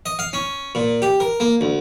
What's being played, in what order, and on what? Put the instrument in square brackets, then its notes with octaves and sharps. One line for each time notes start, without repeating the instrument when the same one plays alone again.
[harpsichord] D#5
F5
C#4
A#2
G4
A#4
A#3
D2